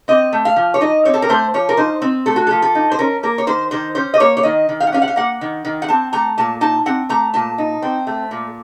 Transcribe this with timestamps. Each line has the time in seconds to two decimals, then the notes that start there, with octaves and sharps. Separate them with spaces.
0.08 C4 D#5
0.33 A3
0.45 F5
0.56 F3
0.74 C#5
0.81 D#4 D#5
1.05 C4 C#5
1.14 A4
1.22 A#4
1.29 A3 C5
1.54 F3 C#5
1.69 A#4
1.77 D#4 C5
2.02 C4
2.26 A3 A4
2.36 F#4
2.47 F3 A4
2.62 A4
2.75 D#4
2.91 C5
2.99 C#4 A#4
3.23 A#3 A#4
3.38 C#5
3.47 D#3 C5
3.71 D#3 C5
3.95 C#4 C5
4.14 D#5
4.20 A#3 C#5
4.37 C#5
4.43 D#3 D#5
4.69 D#3
4.80 F5
4.87 F#5
4.93 C#4 F5
5.02 F#5
5.08 F5
5.16 A#3 F#5
5.41 D#3
5.65 D#3
5.82 F#5
5.88 C4 A5
6.13 A3 A#5
6.38 A#2 A5
6.61 D#4 A5
6.86 C4 F#5
7.09 A3 A#5
7.34 A#2 A5
7.58 D#4
7.82 C4
8.07 A3
8.31 A#2